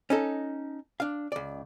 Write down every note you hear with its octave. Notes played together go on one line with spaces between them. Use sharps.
C#4 D#4 A4
D4 F5
C#2 D5